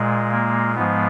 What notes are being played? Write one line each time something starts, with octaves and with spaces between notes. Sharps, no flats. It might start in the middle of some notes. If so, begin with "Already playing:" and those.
Already playing: A#2 G#3
A#3
G#2 F3 G#3 B3